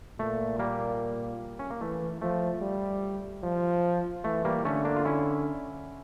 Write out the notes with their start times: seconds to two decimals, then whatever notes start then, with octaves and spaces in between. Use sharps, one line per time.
0.19 A#2 A3
0.59 G3 A#3
1.59 C#4
1.70 A#3
1.80 E3 A3
2.22 F3 A3
2.62 G3
3.43 F3
4.24 E3 A3
4.45 G3 A#3
4.65 D3 A3 C#4
4.85 A#3 D4
4.96 F4
5.05 C#4 E4